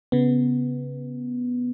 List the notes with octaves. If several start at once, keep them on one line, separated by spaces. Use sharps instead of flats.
C#3 B3